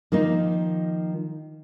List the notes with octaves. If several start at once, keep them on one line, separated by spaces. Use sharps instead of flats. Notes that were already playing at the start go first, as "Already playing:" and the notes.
D#3 F3 A#3 D#4